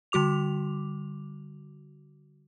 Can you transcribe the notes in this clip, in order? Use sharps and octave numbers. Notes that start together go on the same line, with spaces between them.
D3 G3 F#4 D6 F7